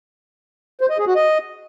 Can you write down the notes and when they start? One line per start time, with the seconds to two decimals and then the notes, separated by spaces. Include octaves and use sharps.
0.81 C5
0.90 D#5
0.98 G#4
1.07 F#4
1.15 D#5